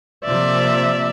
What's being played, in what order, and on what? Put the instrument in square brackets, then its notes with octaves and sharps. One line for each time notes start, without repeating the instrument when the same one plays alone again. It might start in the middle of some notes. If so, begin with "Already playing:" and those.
[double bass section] C3 F3 A#3 [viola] D5 E5